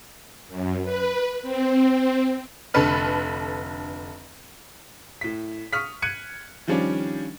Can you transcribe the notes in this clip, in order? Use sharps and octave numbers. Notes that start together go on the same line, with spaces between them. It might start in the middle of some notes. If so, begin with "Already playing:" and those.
F#2
B4
C4
F1 D3 A4 B4 F6
A2 B6
C#6 D#6 F6 B6
F#6 G#6 C#7 D#7
D#3 F3 G3 C#4 D4